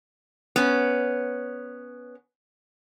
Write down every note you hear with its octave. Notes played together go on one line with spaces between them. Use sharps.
B3 C#4